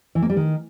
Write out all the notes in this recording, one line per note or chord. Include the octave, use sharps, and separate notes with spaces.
E3
A#3
G3
D#3